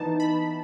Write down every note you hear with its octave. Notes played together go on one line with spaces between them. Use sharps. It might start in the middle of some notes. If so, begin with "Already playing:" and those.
Already playing: E3 B3 D#4 A5
B5